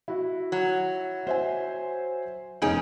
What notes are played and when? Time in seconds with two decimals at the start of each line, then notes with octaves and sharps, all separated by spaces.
0.08 E4 F#4
0.52 F#3
1.27 C5 E5 G#5
2.62 F1 C#4 D#4 G#4 D7